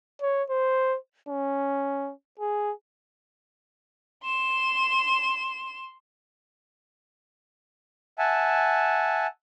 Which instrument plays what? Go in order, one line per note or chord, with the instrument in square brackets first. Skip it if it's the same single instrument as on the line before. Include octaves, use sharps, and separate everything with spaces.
[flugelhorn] C#5
C5
C#4
G#4
[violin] C6 E7
[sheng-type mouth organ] E5 F#5 G#5 A5